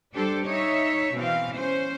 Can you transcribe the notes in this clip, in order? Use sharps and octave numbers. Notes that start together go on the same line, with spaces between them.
G3 D4 G4 A4 C5
D#4 C#5 E5
B2 E3 C4 F5
C#4 C5